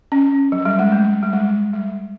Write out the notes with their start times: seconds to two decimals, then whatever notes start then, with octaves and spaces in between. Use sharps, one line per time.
0.12 C#4
0.52 F#3
0.65 G3
0.79 G#3
0.92 A3
1.23 G3
1.33 G#3
1.74 G3